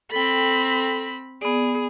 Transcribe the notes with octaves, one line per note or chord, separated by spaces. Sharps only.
C4 A4 G5 B5
B3 G#4 D5